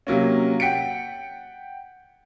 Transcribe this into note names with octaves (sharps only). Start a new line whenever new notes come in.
C3 F#3 A#3 C#4
F#5 G5 B6 C#7 D7